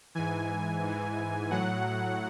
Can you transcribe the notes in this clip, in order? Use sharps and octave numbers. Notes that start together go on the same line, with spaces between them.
G#2 E3 G#5
G#2 E3
A2 F#3 F#5